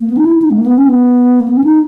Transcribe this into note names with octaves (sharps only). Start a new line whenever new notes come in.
A#3
B3
D#4
E4
D#4
G#3
A#3
B3
C#4
B3
A#3
B3
C#4
D#4